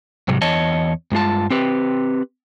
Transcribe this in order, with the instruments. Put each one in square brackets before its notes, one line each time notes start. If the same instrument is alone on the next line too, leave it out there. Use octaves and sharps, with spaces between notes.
[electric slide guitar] G#2 C3 F#3 G3
E2 C#5 D#5 A5
G2 G#3 F4 A5
C4 G4 B4